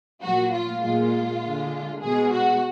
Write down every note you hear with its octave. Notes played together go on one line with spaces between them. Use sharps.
A#2 F#3 F#4
F4
A#2 G#3 F4
D3 G#3
B2 G#3 G#4
F#4